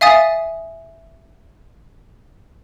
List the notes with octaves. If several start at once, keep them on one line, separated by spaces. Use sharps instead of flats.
E5 F5 G#5 D#6 A6